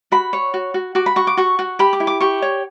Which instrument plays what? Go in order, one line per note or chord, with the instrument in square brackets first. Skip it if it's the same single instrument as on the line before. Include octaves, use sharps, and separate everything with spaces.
[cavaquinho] F#4 B5
C#5
F#4
F#4
F#4 D6
B5
F#4 C#6
D6
F#4 C#6
F#4
G4 B5
D6
E4
D6
G4 C#6
C#5